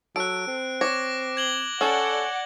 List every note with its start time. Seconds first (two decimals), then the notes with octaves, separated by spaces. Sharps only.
0.16 F#3 A4 F#6 D7
0.47 C4
0.81 C#5 D6 A#6
1.37 G#6 F#7 G7
1.81 C#4 A4 D5 F#5